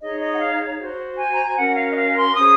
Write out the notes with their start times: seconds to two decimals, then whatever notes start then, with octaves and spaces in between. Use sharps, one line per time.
0.01 D#4 G#4 C#5 D#5
0.21 D#5
0.35 F#5
0.40 F5
0.79 F#4 C5
1.18 G#5
1.33 A#5
1.45 G#5
1.57 C#4 F#4 A#4 F#5
1.77 F5
1.91 D#5
1.96 F5
2.16 C6
2.35 C#4 G#4 C5 D#6